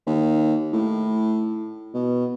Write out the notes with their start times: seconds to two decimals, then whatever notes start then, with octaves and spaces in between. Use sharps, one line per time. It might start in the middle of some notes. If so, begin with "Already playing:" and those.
0.07 D#2
0.73 A2
1.94 B2